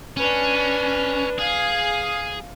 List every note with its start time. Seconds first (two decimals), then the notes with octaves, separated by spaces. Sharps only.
0.17 C#4 D4 B4
1.39 G#4 F5